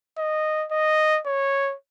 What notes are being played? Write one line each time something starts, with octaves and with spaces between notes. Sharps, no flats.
D#5
D#5
C#5